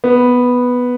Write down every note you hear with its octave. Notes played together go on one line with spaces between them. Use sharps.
B3